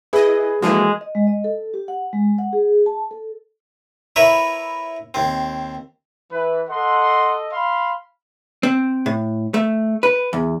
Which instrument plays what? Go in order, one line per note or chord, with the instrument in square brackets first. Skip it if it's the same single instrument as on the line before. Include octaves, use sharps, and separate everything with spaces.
[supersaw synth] E4 D#5 [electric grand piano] G#4 B4
[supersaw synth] E3 F3 A#3 [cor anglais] G#3 [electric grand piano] F#4 A4
[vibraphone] D#5
G#3
D#5
A4
G4
F#5
G#3
F#5
G#4
A5
A4
[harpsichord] E4 A#4 B4 C#5 E5
D#2 C4
[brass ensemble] E3 [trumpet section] B4
[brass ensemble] A4 D#5 [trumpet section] F#5 C6
[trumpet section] F5 B5 C6
[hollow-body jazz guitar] C4
A2
A3
B4
E2